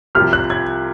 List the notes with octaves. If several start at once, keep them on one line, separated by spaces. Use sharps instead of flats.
C2 C3 F3 F6
F#6
G#6